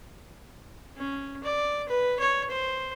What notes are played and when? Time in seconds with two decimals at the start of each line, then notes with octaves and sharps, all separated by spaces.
0.97 C#4
1.44 D5
1.89 B4
2.20 C#5
2.50 C5